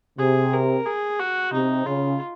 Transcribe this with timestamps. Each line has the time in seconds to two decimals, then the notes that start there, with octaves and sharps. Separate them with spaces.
0.19 C3 G#4
0.53 A#4
0.86 G#4
1.19 F#4
1.52 C3 D#4
1.86 C#3 F4